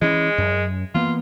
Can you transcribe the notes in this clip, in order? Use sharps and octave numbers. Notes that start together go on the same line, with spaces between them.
E3 G#3 C#4
F#2
E3 A#3 B3 F4